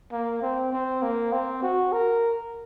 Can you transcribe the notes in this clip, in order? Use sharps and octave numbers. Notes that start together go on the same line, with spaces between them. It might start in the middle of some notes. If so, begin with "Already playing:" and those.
A#3
C4
C4
A#3
C4
F#4
A#4